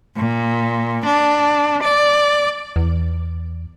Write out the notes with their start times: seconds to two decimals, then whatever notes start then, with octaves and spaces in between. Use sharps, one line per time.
0.16 A#2
1.06 D4
1.83 D5
2.76 E2